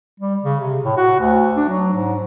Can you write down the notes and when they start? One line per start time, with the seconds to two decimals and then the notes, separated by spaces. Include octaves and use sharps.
0.20 G3
0.44 C#3
0.60 C3
0.83 A2
0.97 F#4
1.20 D2
1.57 D4
1.69 F#3
1.93 G#2